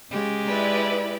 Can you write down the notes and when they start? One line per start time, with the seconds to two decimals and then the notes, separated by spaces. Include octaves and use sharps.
0.11 C#3 G#3 G4
0.47 E4 B4 D5